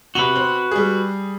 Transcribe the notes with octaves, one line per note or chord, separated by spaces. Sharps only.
C3 F#4 B4 F7 G7
C4
G3 G#4